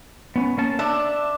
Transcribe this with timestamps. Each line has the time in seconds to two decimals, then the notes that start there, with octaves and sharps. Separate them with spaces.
0.36 B3 C#4
0.57 A#3 C#4 A5
0.79 D4 E5 E6